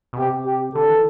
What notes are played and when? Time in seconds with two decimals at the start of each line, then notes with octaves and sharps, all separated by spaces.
0.13 B2
0.18 C3 G4
0.46 G4
0.75 D3 A4
0.89 E3